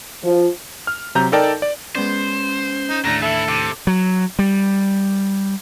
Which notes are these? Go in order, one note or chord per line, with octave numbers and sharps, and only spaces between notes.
F3
F6
C3 F#3 A#5 G6
D#4 A4 A#4 D5 G5 A5
D5
G#3 B3 C#4 C5 D5
D#4
D#2 A2 D3 A3 D4 A#5
E3 E4 A4 E5
C3 D6
F#3
G3